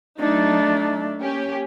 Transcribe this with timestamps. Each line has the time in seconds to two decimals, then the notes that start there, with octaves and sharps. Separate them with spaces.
0.20 F#3 A3 D4 D#4
1.19 A#3 C#4 G4